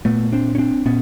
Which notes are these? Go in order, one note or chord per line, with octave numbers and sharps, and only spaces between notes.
A#2 A3 B3
C4 D4
C#4
C4 D4
A#2 B3 C#4